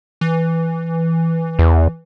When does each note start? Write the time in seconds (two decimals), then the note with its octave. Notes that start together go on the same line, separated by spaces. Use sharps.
0.21 E3
1.59 E2